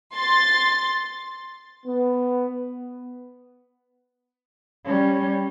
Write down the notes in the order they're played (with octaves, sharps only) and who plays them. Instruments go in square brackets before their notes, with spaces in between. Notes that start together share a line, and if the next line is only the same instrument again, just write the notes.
[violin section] C6 A6
[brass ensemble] B3
[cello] G3 C#4